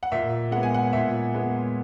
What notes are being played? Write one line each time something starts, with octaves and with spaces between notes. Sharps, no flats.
F#5
A#2 E5
G#3 B3 F#5
G#5
F#5
A#2 E5
G#3 B3